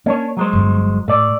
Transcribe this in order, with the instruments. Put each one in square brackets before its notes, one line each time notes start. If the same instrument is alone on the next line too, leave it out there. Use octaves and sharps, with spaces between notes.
[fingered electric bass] A#3 [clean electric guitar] C#4 D4 C#5
[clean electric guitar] F#3 G#3 C5
[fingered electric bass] G1 G2
[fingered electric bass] A2 [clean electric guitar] A3 D5